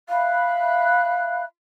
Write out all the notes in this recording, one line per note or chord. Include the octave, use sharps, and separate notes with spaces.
E5 F5 B5 F#6